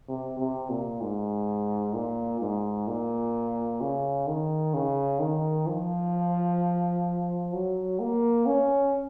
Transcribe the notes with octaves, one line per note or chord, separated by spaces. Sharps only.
C3
C3
A#2
G#2
A#2
G#2
A#2
C#3
D#3
C#3
D#3
F3
F#3
A#3
C#4